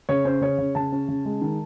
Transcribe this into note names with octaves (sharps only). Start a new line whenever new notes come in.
C#3 C#5
C#4 C5
C#3 C#5
C#3
C#3 A5
C#4
C#3
G#3
D#3